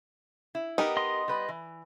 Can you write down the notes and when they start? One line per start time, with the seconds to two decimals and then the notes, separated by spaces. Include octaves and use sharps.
0.55 E4
0.78 B3 D#4 G4 A#4
0.97 D#5 C6
1.28 G3 B4
1.49 E3